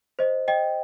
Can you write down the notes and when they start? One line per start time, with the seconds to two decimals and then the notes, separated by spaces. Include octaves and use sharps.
0.19 C5 D#5
0.48 D#5 G5